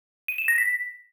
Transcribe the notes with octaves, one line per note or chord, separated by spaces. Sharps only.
D#7
E7
A#6
B6